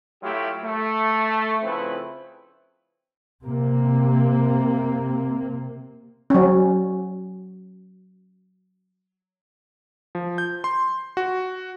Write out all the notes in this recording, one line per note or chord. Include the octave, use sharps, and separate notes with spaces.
F#3 A3 E4 F4 G4
A3
C#3 F3 A3 C4 E4 B4
C3 A#3
F#3 C#4
F3
G6
C6
F#4